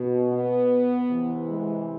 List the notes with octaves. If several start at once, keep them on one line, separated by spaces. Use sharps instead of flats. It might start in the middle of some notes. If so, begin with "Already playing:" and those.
Already playing: B2
B3
C3 E3
G#3